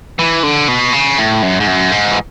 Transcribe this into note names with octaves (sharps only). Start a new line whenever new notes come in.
E3
D3
B2
C#3
A2
F#2
G#2
F#2
G#2
E3